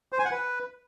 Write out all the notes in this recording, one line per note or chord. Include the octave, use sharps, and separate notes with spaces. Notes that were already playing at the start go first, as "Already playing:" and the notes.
C5
G#5
F#5
B4